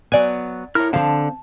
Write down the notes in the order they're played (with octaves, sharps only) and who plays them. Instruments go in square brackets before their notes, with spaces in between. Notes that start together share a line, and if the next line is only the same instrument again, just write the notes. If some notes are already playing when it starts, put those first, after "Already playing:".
[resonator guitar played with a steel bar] F#3 B3 [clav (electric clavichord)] D5 G#5
[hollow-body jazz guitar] E4 C#5 [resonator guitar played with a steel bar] A#4 [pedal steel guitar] F6
[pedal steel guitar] D3 [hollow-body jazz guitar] C4 F5 [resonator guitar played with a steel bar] A5